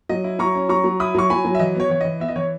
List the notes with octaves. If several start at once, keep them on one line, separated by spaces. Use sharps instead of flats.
F#3 D#5
E4
F#3 A#5 C#6
C#4
F#3 A#5 C#6
F#3
E4 B5 D#6
F#3 C#6
F#3 G#5 B5
F#3
E5
E3 D#5
B3 C#5
E3 C#5
E3 D#5
B3 E5
D#5
E3 C#5